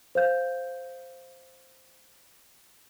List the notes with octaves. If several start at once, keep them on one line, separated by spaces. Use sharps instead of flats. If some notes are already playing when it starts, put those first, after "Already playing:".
C5 F5 G6